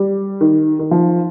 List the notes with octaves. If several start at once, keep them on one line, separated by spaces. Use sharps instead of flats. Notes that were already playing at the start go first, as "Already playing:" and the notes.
Already playing: G3
D#3
D#3
F3